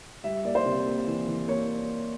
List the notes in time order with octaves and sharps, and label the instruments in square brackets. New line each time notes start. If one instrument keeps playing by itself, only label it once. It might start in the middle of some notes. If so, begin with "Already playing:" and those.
[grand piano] G3 E5
A#3 D5
C5
C3
A#3
E3
E3
A#3 C#5